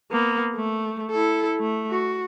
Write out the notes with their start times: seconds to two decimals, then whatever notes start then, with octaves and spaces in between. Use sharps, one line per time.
0.11 A#3 B3
0.56 A3
1.11 E4 A4
1.60 A3
1.91 F#4